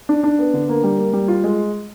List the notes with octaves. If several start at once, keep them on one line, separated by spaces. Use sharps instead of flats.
D4
D4
B3
D3
A#3
G3
A#3
G3
F4
G#3